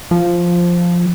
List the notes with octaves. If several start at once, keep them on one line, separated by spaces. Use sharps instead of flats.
F3